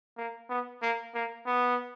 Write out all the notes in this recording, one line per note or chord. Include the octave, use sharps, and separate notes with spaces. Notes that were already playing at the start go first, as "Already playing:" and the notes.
A#3
B3
A#3
A#3
B3